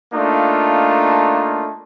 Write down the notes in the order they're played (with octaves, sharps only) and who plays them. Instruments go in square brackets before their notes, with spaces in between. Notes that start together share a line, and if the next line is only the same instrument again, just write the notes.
[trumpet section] A3 A#3 D4 D#4 F4